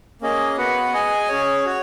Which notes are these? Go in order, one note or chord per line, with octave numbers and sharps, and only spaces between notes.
A#3 C#4 G#4 D#5
B3 F#4 B4 F#5
G#4 D#5 G#5
C#4 G#4 C#5
F#4 C#5